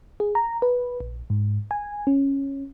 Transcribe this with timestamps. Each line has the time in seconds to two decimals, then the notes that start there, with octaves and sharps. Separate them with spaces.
0.20 G#4
0.35 A#5
0.62 B4
1.00 A#1
1.30 G#2
1.71 G#5
2.07 C#4